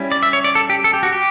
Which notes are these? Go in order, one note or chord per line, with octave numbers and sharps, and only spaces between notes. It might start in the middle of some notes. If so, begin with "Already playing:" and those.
Already playing: G3 C#4 E4
D5
E5
C#5
D5
A4
G4
A4
G4
F#4
G4